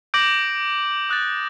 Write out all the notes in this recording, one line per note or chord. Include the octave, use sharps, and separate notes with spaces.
D6 G6 A#6 D7 F#7
D#6 F#6 A6